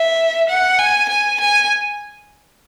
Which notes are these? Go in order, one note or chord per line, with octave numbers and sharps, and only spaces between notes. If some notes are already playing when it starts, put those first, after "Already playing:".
Already playing: E5
F#5
G#5
G#5
G#5